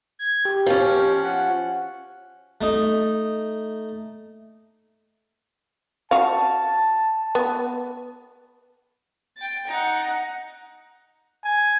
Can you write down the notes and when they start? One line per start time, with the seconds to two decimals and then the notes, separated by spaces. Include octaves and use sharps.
0.19 G#6
0.45 G4
0.66 F3 C#4
1.23 F#5
2.61 A3 D#4
6.11 F#4 F5 A5
7.35 B3
9.37 G5 A6
9.68 D#4 F#5
11.44 G#5